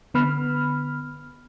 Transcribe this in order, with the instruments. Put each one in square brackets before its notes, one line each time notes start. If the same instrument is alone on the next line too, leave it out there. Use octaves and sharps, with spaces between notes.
[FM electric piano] D3 B3 B5 F6